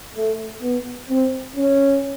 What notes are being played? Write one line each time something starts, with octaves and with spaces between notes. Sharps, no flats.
A3
B3
C4
C#4